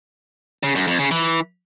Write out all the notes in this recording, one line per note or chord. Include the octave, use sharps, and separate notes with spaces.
C#3
F#2
F2
C#3
E3